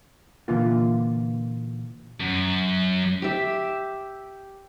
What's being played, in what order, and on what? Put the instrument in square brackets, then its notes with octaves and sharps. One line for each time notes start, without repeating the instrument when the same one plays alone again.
[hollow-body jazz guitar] A#2 D3 E3 A#3 F4
[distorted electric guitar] F#2
[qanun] G4 E5